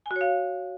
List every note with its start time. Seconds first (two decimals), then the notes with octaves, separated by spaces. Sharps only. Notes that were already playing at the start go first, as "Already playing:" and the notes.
0.06 G#5
0.11 F#4
0.16 C#5
0.21 F5